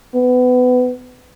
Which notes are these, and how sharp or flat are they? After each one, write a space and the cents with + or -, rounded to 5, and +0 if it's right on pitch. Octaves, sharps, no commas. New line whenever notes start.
B3 +25